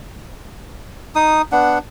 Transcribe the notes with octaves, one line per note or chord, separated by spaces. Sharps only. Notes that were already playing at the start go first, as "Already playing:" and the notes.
D#4 D#6
B3 D4 F#5